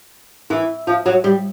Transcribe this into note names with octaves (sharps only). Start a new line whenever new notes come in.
E3
F3
F#3
G3